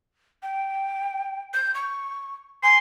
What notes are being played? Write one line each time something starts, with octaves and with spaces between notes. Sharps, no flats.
G5
G6
C#6
G#5 C6